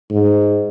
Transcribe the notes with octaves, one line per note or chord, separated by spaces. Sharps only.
G#2